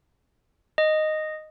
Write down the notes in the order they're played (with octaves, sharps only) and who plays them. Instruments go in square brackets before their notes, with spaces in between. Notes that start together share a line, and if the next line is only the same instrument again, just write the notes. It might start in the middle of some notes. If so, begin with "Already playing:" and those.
[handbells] D#5